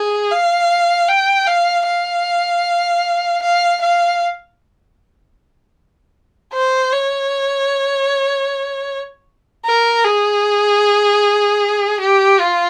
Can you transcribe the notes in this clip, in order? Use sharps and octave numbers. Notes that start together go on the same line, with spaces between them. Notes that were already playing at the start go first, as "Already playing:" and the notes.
Already playing: G#4
F5
G5
F5
F5
F5
F5
C5
C#5
A#4
G#4
G4
F4